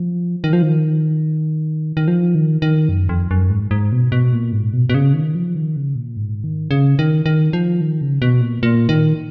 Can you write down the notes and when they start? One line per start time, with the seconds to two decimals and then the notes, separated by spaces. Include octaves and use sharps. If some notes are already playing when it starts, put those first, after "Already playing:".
Already playing: F3
0.44 D#3
0.53 F3
0.62 D#3
1.97 D#3
2.08 F3
2.35 D#3
2.62 D#3
2.89 F#2
3.09 F2
3.31 F#2
3.50 G#2
3.71 G#2
3.92 B2
4.12 B2
4.33 A#2
4.52 G#2
4.73 B2
4.90 B2
4.94 C#3
5.14 D#3
5.35 F3
5.55 D#3
5.76 C#3
5.96 A#2
6.17 G#2
6.44 D#3
6.71 C#3
6.99 D#3
7.26 D#3
7.53 F3
7.81 D#3
8.01 C#3
8.22 B2
8.41 A#2
8.63 A#2
8.89 D#3